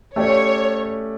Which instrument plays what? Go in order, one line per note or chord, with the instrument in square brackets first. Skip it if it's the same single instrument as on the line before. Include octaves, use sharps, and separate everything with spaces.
[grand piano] A3 C#4 G4 D5 [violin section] C#5